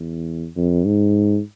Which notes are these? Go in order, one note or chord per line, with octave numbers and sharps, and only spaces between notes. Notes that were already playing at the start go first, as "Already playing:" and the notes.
Already playing: E2
F2
G#2